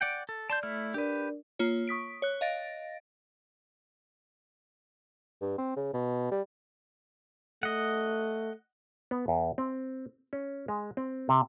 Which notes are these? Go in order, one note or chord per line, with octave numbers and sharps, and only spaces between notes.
D5 F#5 G5
A4
D5 A5 C6 G6
A3 E4 F6
D4 G4 A#4 B4 D5
A#3 F4 C#5
C#6 D#6 B6 D7
C#5 F#6
D#5 F5 A6 A#6 D7
G2
C4
C#3
B2
G3
A3 D#5 F#5
B3
E2
C4
C#4
G#3
C4
C3